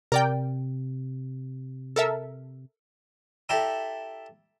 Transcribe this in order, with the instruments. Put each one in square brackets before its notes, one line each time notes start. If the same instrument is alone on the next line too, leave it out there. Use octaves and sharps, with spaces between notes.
[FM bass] C3 [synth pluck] A#4 D5 G5
[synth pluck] A4 A#4 E5
[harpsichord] E4 G4 A4 D5 E5 A#5